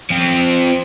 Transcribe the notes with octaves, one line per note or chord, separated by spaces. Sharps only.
F3 C4